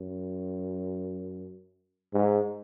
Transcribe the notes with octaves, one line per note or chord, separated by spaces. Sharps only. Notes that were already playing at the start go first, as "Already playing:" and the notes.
Already playing: F#2
G#2